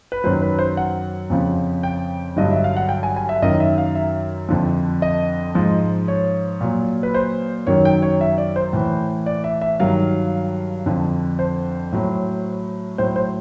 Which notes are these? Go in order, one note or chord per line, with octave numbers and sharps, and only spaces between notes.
B4
F#2 D#3 F#3 C5
B4
C5
F#5
F2 C#3 F3
G5
G2 D3 F#3 D#5
E5
F5
F#5
G5
G#5
G#5
E5
F#2 D#3 F#3 D#5
E5
F5
E5
F2 D3 F3
D#5
G#2 F3
C#5
A#2 F#3
B4
C5
F#2 D#3 F#3 C#5
G5
C#5
E5
D5
C5
A2 E3
D5
E5
E5
G2 D#3 F#3 F5
F2 D3 F3
C5
A2 F#3
A2 F#3 C5
C5